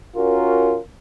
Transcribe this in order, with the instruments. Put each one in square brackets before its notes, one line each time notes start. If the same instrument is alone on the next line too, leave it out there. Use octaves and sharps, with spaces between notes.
[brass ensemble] C#4 F4 F#4 A#4